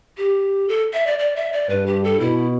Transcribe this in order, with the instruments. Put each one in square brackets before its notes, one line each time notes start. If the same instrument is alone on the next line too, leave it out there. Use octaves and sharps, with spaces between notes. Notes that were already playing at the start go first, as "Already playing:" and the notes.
[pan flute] G4
A4
E5
D5
D5
E5
D5
[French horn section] G2 [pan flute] B4
[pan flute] G4
A4
[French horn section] B2 [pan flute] E4